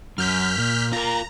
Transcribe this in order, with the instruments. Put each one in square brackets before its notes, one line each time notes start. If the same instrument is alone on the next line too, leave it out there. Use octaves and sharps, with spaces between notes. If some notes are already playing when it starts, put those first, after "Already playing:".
[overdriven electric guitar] F#2 [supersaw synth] F6 G6 B6
[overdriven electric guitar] A#2
[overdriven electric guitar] F4 A#4 [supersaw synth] A#5